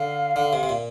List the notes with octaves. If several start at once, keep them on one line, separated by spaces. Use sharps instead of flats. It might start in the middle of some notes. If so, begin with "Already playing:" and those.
Already playing: D3 F5
D3
C3
C3
A#2